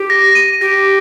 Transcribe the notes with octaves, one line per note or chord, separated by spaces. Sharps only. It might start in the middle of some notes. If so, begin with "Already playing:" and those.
Already playing: G4
A#6
D#7
G4 A#6